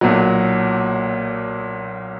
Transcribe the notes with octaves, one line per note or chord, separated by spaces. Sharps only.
B1 A#2 F#3